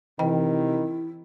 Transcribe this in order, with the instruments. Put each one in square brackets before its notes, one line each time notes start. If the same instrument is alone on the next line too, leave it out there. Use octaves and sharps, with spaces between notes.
[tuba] C3 [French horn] D#3 [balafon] E3 D#5 G5 [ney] E4